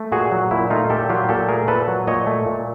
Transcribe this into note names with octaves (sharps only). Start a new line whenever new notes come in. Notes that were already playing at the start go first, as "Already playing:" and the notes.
Already playing: A3
A#2 F#4 G#4
F#3
A#2 E4
A3 D#4 F4
A#2 G4 A4
F#3 F4 G4
A#2 G4 A4
A3 G#4 A#4
A#2 A4 B4
F#3
A#2 C#5 D#5
A3
A#2